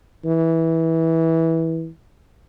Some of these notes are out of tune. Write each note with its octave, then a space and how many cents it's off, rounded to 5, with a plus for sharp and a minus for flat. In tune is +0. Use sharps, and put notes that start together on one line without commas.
E3 -15